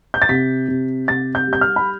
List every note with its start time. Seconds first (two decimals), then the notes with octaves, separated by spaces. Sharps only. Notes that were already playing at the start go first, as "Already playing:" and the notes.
0.14 G6
0.22 A6
0.29 C3 B6
0.68 C3
1.08 C3 A6
1.35 G6
1.48 G3
1.53 G6
1.61 F6
1.76 B5